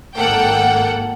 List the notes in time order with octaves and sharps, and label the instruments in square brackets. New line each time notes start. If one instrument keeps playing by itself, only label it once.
[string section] G#1 A#3 A4 F#5 G5